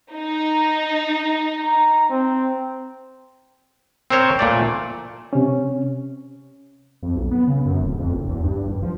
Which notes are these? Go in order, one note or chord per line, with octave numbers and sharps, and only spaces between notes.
D#4
A#5
C4
C4 A#4 C5 C#5
A#2 A3 D5
C3 C#4
F2
B1
B3
C#3
F#2
D1
F2
F#1
E2
G2
F#1
F3